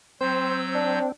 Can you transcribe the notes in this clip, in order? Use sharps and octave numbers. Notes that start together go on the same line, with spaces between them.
F#3 C4 C5 E6 G6
D4